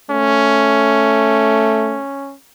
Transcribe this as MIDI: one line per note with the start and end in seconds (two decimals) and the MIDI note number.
0.10 2.00 57
0.10 2.35 61